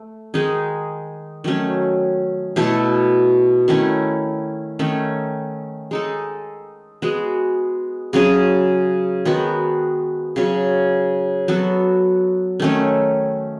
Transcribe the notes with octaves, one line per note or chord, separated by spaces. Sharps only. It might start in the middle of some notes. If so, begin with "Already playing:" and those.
Already playing: A3
D#3 G#3 D#4 G#4
D#3 F#3 A3 C#4
B2 A3 E4 A4
D#3 A3 C#4 E4
D#3 A3 C#4
G#3 D#4 A4
G#3 B3 F#4
C#3 F#3 C#4 G#4
D#3 G#3 B3 F#4
C#3 F#3 C#4
F#3 B3 F#4 A4
D#3 A3 C#4